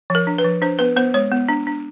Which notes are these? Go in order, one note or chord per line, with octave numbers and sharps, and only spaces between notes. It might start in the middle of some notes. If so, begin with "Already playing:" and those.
F3 A#4
D4
B4
F3
D4 C5
B3 B4
B3 C5
G#3 C#5
B3
D4
D4